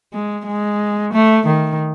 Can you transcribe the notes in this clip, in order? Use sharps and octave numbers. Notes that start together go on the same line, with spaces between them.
G#3
G#3
A3
D#3